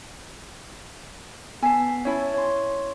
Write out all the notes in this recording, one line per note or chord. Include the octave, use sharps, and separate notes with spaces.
B3 G#5 A5 B6 C7
C#4 E4 C#5 G#5 A5 B5
C#5 C6